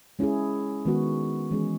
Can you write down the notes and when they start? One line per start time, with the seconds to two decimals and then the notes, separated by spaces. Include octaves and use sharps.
0.19 G#3 C#4 E4 G#4
0.85 D#3 G#3 B3 F#4
1.51 E3 G#3 C#4 G#4